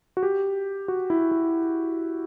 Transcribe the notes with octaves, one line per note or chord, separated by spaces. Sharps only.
F#4
G4
F#4
E4
E4